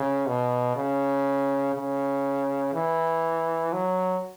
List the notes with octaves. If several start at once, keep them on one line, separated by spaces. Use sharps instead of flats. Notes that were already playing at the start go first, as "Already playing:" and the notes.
Already playing: C#3
B2
C#3
C#3
E3
F#3